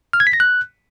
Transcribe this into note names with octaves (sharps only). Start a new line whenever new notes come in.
F6
G#6
B6
A#6
F#6